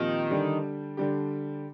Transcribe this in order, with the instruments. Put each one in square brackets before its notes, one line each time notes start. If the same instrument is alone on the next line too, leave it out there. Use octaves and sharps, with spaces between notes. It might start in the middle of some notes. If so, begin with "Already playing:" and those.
Already playing: [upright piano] A#2 F3 C4 G4 [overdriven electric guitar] D#3
[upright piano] D3 G3 D4 G4
D3 G3 D4 G4